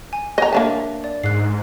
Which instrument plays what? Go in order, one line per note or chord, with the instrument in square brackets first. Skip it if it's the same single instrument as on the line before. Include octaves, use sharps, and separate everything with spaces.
[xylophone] G#5
[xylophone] C#5 [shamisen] D#5 A#5
[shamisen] A#3 D4 A5 [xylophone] E5
[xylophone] D5
[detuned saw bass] G#2 [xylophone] F#6 C7